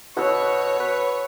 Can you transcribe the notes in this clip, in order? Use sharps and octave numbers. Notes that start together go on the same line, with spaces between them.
B2 C#5 F#5 E6
B4